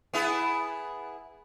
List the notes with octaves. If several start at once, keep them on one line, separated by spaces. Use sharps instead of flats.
B3 E4 G#4